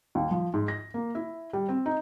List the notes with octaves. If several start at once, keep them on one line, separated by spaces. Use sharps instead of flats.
D#2
F3
G#2
A#6
A#3
E4
G3
C4
D#4